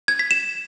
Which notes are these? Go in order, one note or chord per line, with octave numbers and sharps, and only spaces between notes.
G#6
B6
E7